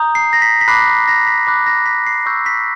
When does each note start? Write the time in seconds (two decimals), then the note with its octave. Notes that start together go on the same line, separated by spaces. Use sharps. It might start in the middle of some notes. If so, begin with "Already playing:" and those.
Already playing: A#5 D#6 G6
0.15 C7
0.33 A#6
0.42 B6
0.61 B6
0.68 B5 D6 F#6 C7
1.08 A#6
1.27 B6
1.46 B5 D6 F#6 B6
1.66 A#6
1.86 B6
2.07 C7
2.26 C#6 E6 G6
2.46 B6